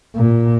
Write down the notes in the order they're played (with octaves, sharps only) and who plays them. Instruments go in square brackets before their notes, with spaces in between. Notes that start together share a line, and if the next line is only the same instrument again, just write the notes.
[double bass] A#2